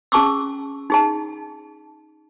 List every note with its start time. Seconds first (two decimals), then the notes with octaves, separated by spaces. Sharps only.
0.12 C#4 G#4 A5 C#6 D6 E6
0.90 D#4 G#4 A5